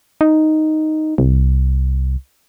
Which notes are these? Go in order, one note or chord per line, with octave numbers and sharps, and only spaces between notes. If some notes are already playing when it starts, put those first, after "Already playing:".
D#4
C2